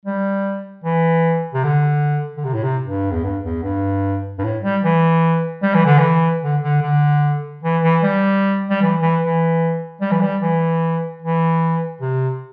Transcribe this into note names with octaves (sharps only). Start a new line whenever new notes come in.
G3
E3
C3
D3
D3
C3
A2
C3
G2
E2
G2
E2
G2
G2
A2
G3
E3
G3
E3
D3
E3
D3
D3
D3
E3
E3
G3
G3
E3
E3
E3
G3
E3
G3
E3
E3
C3